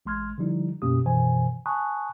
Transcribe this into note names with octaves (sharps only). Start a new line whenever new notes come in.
A1 G#3 C6 F6 G#6
D3 F3 G3 D#4 E4
F#2 B2 A#3 C#4 G4 D#6
F#2 B2 D#3 E3 C5 G#5
G#5 A5 B5 C#6 D#6 F#6